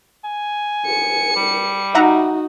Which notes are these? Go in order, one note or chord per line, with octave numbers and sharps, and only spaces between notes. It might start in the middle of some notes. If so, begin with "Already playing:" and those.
G#5
C#7
G3
D#4 F#4 E5 F#5 A#5